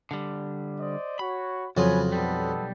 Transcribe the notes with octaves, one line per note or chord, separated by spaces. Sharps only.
D3 G3
C5 D5 D#5
F#4 C#5 B5
F2 C#3 F#3 F4 C#5 G#5 B5 D#6
B1 G3 B3 A4